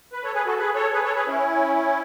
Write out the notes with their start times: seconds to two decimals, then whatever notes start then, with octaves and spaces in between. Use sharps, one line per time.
0.13 B4
0.23 A4 C#5
0.34 G#4 B4
0.46 F#4 A4
0.58 G#4 B4
0.75 A4 C#5
0.93 G#4 B4
1.04 A4 C#5
1.16 G#4 B4
1.28 C#4 E4